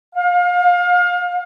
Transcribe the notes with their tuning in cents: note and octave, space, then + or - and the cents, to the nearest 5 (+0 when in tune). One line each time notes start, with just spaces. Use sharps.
F5 +30